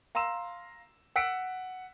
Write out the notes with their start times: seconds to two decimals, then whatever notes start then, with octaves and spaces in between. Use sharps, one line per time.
0.15 F5 A#5 C6 E6 E7
1.16 F#5 E6 F#6 B6 C#7 D7